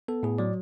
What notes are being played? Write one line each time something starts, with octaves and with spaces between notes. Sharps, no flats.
B3 A4
A2 G#4
F#3 D5